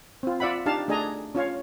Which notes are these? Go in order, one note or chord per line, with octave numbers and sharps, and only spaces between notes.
C4 F4
F4 D5 E5 F#5 B5
D4 D#4 G4 F5 A5
A3 D4 G#4 D#5 G#5 A#5
C#4 F4 C#5 F5